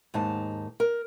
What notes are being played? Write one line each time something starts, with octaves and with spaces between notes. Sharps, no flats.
D#2 G#2 D#4 A5
A#4